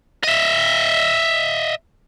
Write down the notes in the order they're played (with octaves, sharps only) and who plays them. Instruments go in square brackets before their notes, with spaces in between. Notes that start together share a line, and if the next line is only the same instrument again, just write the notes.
[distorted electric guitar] D#5 E5